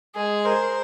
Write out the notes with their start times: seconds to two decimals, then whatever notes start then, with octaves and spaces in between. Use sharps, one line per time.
0.15 G#3 G#4
0.44 A#4 C5